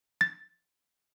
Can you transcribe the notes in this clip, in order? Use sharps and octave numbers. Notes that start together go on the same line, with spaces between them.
A6